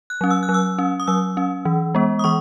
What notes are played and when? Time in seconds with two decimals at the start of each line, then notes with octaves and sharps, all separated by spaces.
0.10 F#6
0.21 F#3 C#4
0.30 E6
0.43 F#6
0.49 F#3
0.54 E6
0.78 C#4
1.00 D#6
1.07 F#3 E6
1.37 C#4
1.65 E3
1.95 G#3 B3
2.19 D#6
2.24 E3 C#6